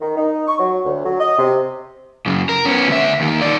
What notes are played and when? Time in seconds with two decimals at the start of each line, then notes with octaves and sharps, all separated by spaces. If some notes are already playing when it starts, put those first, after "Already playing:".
0.01 D#3
0.17 D#4
0.47 C#6
0.59 F#3
0.85 D2
1.04 F#3
1.20 D#5
1.39 C3
2.26 F#2 C#3
2.49 A#4
2.66 B3 C#4
2.88 D2 E5
3.20 D#2 D#3
3.42 D#3 D5